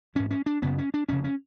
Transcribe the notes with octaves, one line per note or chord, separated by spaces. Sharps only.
A1 G#2 C#4
C#4
D4
F#1 F#2 C#3 B3
C#4
D4
F1 F2 C#3 C#4
C#4